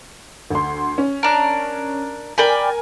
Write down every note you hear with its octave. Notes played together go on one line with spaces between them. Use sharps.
D2 C6
C#4
D4 A#4
A#4 D5 G5 G#5 B5